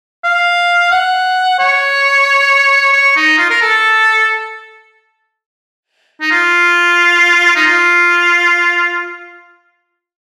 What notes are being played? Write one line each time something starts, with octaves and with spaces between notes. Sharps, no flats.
F5
F#5
C#5
C#5
D#4
F4
A#4
A4
D#4
F4
D#4
F4